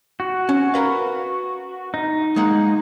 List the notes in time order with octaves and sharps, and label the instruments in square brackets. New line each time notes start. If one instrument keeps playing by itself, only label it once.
[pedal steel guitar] F#4
[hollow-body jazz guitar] C#4
A#4 B4 F5
[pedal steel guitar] D#4
[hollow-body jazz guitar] G#3 A#3 F#5